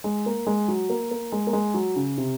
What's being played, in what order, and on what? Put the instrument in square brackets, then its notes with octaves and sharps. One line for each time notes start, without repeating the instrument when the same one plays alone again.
[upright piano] G#3
A#3
G#3
F#3
A#3
A#3
G#3
A#3
G#3
F#3
C#3
C3